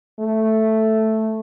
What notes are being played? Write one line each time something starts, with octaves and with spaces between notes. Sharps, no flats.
A3